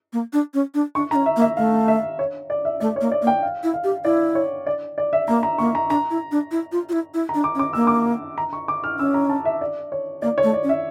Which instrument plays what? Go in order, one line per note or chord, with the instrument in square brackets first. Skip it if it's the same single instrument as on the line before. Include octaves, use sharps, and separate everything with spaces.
[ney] A#3
D4
C#4
D4
[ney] D4 [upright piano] C#6
[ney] D4 [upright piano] A#5
[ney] C#4
[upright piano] E5
[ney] A#3
[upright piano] E5
[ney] A3 [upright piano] F5
[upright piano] E5
C#5
D5
E5
[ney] A3 [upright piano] D5
[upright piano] C#5
[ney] A#3
[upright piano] D5
[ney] A#3
[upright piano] G5
F5
[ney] E4
[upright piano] F5
[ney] G4
[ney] E4 [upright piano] D5
[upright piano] C#5
D5
D5
E5
[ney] A#3 [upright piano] A#5
[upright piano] A#5
[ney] A#3 [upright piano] C#6
[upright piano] A#5
[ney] D4 [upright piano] A#5
[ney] E4
D4
E4
F4
F4
E4
E4
[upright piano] A#5
[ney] D4
[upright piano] D6
[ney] C#4
[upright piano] D6
[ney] A#3 [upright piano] E6
[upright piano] D6
A#5
C#6
D6
F6
[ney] C#4 [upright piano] E6
[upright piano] A#5
A5
E5
D5
C#5
[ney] A#3 [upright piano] D5
[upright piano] C#5
[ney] A3
[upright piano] D5
[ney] C#4
[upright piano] E5